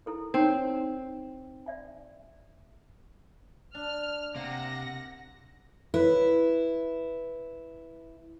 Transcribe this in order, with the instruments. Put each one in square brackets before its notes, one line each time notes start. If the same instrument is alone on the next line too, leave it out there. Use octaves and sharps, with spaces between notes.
[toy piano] E4 A4 A#4
[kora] C4 [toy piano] D#4 C#5
[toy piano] D5 E5 G#5
[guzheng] D4 [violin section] F6
[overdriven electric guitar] C3 [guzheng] A#3 [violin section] F#5 A#6
[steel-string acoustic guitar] E4 [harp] B4